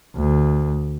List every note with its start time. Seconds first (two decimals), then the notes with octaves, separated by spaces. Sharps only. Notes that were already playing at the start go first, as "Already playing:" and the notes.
0.16 D2